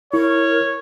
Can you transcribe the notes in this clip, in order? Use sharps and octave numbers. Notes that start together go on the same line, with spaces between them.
E4 A#4 C#5